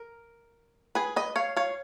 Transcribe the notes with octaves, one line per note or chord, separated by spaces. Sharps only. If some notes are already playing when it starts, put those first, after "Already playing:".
Already playing: A#4
G#4 B4
B4 D#5
C#5 F5
C#5 F5